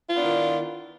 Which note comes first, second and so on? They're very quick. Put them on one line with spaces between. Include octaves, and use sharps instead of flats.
F4 B3 D4 E4 D#3